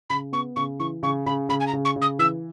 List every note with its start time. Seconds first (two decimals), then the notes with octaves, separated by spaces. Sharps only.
0.09 C#3 B5
0.32 B3 C#6
0.56 C#3 C#6
0.79 E3 C#6
1.03 C#3 C#6
1.26 C#3 B5
1.49 C#3 B5
1.60 G#5
1.67 A#5
1.73 C#3
1.85 C#6
1.96 C#3
2.01 D#6
2.19 E3 E6